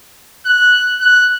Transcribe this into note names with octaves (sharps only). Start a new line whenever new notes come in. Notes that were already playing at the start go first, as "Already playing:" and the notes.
F#6
F#6